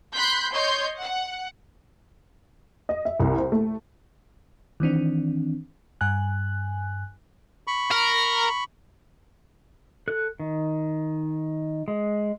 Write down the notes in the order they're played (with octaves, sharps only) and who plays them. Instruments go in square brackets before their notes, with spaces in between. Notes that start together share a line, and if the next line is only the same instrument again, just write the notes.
[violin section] B5 C6 F#6 G6 B6
C#5 D#5 C6 G6
F#5
[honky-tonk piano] D#5
E5
C2
C5
A3
[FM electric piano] D#3 E3 C4 D4
G2 G#5 F#6
[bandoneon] B5 C#6
[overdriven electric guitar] A#4
[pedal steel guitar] A4 F#6
D#3
G#3